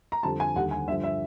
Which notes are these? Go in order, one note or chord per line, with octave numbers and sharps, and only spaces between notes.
A#5
F2 D3 G3 A5
G#5
D#2 D3 G3 F#5
G#5
G2 D3 F3 E5
E5